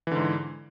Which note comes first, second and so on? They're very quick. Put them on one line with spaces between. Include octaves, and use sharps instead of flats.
E3 D3 G#2